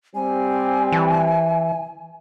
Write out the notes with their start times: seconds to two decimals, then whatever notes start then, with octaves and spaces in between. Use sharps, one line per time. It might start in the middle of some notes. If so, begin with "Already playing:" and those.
0.15 G3 C4 G#5
0.92 E3